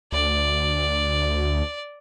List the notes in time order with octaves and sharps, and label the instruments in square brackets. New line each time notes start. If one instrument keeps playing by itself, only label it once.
[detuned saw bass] D2 [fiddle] D5